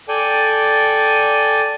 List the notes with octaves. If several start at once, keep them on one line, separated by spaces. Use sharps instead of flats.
A4 D5 G5 G#5